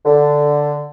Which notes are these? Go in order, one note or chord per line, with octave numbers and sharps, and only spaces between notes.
D3